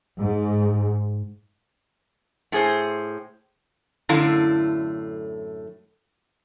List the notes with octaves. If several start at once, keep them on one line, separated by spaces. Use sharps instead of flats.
G#2
A2 G#4 C5
F#2 A2 D3 A3 E4 F5